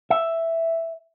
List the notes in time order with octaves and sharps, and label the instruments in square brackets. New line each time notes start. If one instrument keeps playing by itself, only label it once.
[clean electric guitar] E5